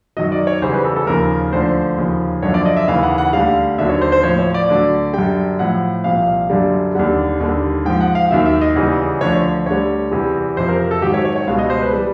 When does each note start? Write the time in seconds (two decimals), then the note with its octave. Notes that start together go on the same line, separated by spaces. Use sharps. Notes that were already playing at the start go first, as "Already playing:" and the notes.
0.17 F#2 D#3 F#3 D#5
0.32 D5
0.47 C#5
0.62 E2 C#3 E3 G3 C5
0.74 B4
0.85 A4
0.96 A4
1.07 D#2 C#3 F3 A#4
1.52 D2 D3 F3 C5
1.98 D#2 C#3 F3
2.43 F#2 D3 F3 C#5
2.54 D5
2.65 D#5
2.77 E5
2.88 D#2 C#3 E3 F5
3.03 F#5
3.18 F#5
3.33 D2 D3 G3 F5
3.78 D#2 D3 F#3 E5
3.89 C#5
4.02 C5
4.12 C5
4.23 A2 F3 C#5
4.39 C#5
4.54 D5
4.69 D2 D3 F#3
5.14 F#2 D3 G3 G5
5.59 A2 F3 F#5
6.04 C2 A#2 F3 F5
6.50 F#2 D3 G3
6.95 D#2 D3 G3 F#5
7.40 D#2 D3 G3
7.85 G#2 F3 G5
8.01 F#5
8.15 F5
8.30 D#2 D#3 F#3 E5
8.45 E5
8.61 D#5
8.76 E2 C#3 E3 G3
9.21 D2 D3 F3 C#5
9.36 C#5
9.66 D2 D3 G3 C#5
10.11 E2 C3 E3 G3
10.57 F2 C3 F3 C5
10.68 A#4
10.80 A#4
10.91 A4
11.02 G#2 D#3 F#3 G4
11.14 C#5
11.25 C#5
11.36 C#5
11.47 C#2 B2 G3 F5
11.59 D#5
11.70 C5
11.81 B4
11.93 E3 G3